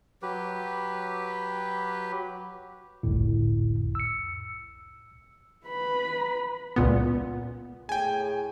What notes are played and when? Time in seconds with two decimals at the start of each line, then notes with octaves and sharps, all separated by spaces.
0.22 F#3 G4 B4
3.03 G1 C2 F2 A2
3.95 E6 C#7
5.67 B4 B5
6.76 C#2 A#2 B3
7.89 A2 G#4 G5 G#5